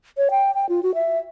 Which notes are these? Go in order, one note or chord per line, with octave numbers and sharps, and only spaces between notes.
C#5
G5
G5
F4
F#4
E5